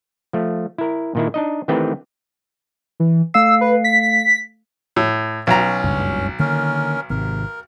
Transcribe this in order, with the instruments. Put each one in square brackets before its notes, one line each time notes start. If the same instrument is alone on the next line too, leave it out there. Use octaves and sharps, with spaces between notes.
[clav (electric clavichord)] F3 A3
E4 A#4
A#2 D#3 E4
D4 D#4 D#5
D#3 E3 A3 C4 G4 B4
[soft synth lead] E3
[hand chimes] A3 F5 C7 [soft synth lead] E6
[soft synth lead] B4
B6
[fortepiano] A2
[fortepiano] B1 A#5 [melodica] C#4
[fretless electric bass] F#1 C#2 G2
[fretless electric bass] D3 D#3 A#3 [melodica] C#4 A#4
[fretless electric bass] G#1 C3 [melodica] A#4